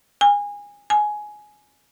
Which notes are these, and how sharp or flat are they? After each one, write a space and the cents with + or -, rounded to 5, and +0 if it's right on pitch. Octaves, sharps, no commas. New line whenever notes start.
G#5 -25
G#5 +15